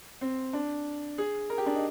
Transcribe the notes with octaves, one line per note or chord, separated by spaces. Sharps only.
C4
D4
G#4
A#4
G4
D4
D#4